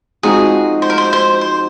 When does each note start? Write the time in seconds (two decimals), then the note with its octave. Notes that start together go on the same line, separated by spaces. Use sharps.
0.23 F3 G#3 C4 D#4 F#4 G#4
0.82 C5
0.90 A#4
0.98 C5
1.13 C5
1.41 C5